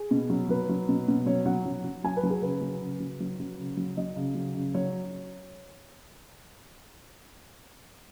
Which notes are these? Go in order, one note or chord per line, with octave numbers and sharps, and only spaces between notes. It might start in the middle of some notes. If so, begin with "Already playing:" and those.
Already playing: G#4
B2
F#3
F#3 B4
F#3
B2
B2
F#3 C#5
F#3 F#5
F#3
F#3
F#3 G#5
B4
F#3
G#4
C#3 B4
F#3
C#3
F#3
F#3
F#3
C#3
F#3
F#3 D#5
C#3
F#3
C#3
F#3 C#5